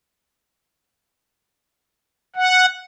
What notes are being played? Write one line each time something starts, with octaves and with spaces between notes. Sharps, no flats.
F#5